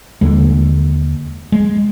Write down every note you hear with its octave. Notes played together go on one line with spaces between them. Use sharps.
D#2 D3 G#3
G#3